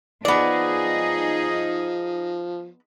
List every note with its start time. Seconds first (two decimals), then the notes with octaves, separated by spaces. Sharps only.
0.25 F3 B3 D#4 G#4 D5 D#5